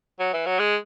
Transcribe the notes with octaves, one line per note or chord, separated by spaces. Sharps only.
F#3
E3
F#3
G#3